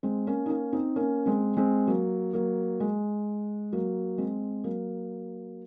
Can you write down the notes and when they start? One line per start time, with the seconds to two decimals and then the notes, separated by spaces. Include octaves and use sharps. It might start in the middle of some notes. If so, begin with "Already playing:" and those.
0.03 G#3 C4
0.27 A#3 C#4
0.46 D#4
0.49 A#3 C#4
0.72 C4 D#4
0.96 A#3 C#4
1.26 G#3 C4
1.57 G#3 C4
1.87 F#3 A#3
2.33 F#3 A#3
2.80 G#3
3.72 F#3 A#3
4.18 G#3 C4
4.64 F#3 A#3